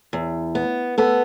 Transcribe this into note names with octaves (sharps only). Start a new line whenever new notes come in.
E2
B3
B3 A4